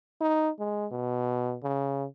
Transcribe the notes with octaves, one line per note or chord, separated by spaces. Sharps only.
D#4
G#3
B2
C#3